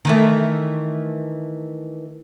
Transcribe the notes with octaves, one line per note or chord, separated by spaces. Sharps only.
D#3 E3 A3